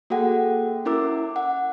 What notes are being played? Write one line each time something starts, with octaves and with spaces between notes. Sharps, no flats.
A#3 F#4 G#4 A4 F#5 G5
C#4 E4 A#4 D6 E6
F#5